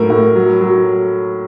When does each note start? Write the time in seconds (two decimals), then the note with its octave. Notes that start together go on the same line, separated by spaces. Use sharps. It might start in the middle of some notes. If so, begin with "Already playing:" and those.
Already playing: A2 F#3 A#4
0.10 A2
0.36 F#3
0.61 F#3